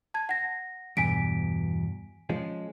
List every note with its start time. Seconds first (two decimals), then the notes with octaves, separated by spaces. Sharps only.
0.14 A5 G#6
0.29 F#5 A#6
0.97 E2 G2 B2 G#5 B6 D7
2.29 F3 G#3 C#4